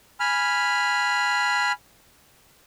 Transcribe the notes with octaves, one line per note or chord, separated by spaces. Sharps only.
G#5 B5 F6